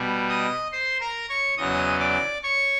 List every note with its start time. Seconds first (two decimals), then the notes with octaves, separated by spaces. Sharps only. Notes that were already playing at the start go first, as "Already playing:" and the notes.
Already playing: B2 G3
0.29 D#5 D#6
0.72 C5 C6
1.00 A#4 A#5
1.29 C#5 C#6
1.57 E2 C#3 F#3 D#5 D#6
2.00 D5 D6
2.43 C#5 C#6